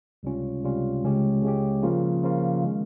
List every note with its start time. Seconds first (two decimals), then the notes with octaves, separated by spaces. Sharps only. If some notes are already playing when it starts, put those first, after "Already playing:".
0.23 C#2 C3 G3 C#4 F4
0.63 C#2 C3 G3 C#4 F4
1.03 C#2 C#3 G#3 C#4 G4
1.43 C#2 C#3 G#3 C#4 G4
1.83 C#3 F3 A#3 F4
2.23 C#3 F3 A#3 F4
2.64 D#3 G#3